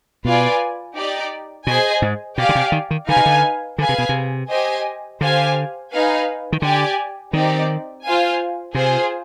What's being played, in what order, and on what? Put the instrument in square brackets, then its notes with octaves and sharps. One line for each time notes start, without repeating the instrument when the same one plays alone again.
[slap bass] B2 [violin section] F4 B4 D5 G#5
[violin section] D#4 G4 D5
[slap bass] B2 [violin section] G#4 C5 D#5 G#5
[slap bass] G#2
[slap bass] B2 [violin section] G4 D5 F5 G#5
[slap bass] D3
C3
D#3
D#3
[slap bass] D3 [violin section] D#4 B4 F5 G#5
[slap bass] C3
D3
[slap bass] D3 [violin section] G#4 B4 F5 G#5
[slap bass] C3
B2
C3
[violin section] G4 C5 D#5 G#5
[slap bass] D3 [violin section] G4 C5 F5 G#5
[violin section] D#4 B4 F5 G#5
[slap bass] D#3
[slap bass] D3 [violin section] G4 D5 G#5
[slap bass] D#3 [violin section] C4 D#4 G4 D5
[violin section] F4 C5 F5 G#5
[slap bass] C3 [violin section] F4 G#4 C5